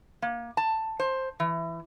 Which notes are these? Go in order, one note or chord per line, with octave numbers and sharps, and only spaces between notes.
A#3
A5
C5
E3